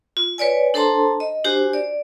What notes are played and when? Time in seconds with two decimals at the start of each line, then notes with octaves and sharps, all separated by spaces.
0.17 F4
0.38 B4 C#5 D5 G#5
0.74 D4 A4 C5 A5 A#5 C6
1.20 D#5
1.44 D4 F#4 G4 C5 G#5
1.73 D5